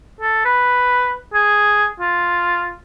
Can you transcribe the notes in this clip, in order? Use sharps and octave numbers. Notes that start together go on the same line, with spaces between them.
A4
B4
G#4
F4